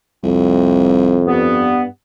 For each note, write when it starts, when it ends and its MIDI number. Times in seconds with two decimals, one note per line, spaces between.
0.24 1.33 36
0.24 1.78 41
1.27 1.82 43
1.27 1.82 59